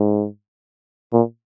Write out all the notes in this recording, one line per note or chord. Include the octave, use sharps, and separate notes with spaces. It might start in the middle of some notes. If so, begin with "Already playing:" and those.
Already playing: G#2
A#2